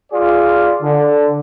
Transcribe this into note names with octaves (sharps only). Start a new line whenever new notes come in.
F4 G#4 D5
D3